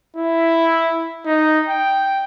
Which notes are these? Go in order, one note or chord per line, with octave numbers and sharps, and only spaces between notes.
E4
D#4
G5